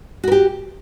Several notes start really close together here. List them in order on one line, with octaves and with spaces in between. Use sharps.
F#4 A#4 G4